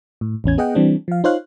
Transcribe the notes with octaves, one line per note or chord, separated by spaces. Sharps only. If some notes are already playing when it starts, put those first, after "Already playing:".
A2
A1 E2 C#4 G#6
B3 G#4 D#5 F#5 G5
E3 G3 C4 D4
F3 F5
D#4 F4 C5 C#5 F5 F#6